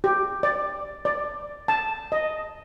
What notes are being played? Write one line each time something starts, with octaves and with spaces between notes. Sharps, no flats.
G4
D5
D5
A5
D#5